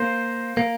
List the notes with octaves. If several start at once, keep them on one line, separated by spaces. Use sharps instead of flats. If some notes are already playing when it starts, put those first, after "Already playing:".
Already playing: A#3 C5
A#3